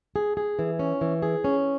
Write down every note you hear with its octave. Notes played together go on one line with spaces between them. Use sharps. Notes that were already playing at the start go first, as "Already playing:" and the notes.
G#4
G#4
E3
C#4
E3
G#4
C#4